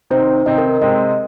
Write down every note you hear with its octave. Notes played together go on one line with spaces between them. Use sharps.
C3 D#3 C4 D#4 C5
C3 D#3 C4 D#4 D#5
A#4
C3 G#3 C4 D#5